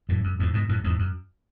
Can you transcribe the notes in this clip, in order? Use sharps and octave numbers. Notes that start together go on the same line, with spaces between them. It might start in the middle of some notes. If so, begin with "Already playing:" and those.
F#2 A2
F#2
E2 G#2
G#2 B2
F#2 A2
E2 G#2
F#2